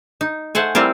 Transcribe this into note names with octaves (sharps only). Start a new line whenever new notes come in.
D#4
A3 C5 F#5 G#5
G3 C4 E4 F4 A#4